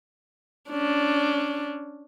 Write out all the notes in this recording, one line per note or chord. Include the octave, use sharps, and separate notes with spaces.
C#4 D4